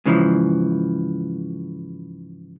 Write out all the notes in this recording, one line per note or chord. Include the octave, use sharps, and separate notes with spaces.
G#2 C#3 E3 F3